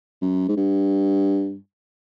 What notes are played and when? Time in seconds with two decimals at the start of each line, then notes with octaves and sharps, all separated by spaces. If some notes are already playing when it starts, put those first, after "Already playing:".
0.21 F#2
0.48 G#2
0.57 G2